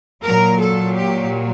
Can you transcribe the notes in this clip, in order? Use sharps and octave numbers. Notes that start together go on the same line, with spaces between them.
A#2 F#3 A#4
A4
G4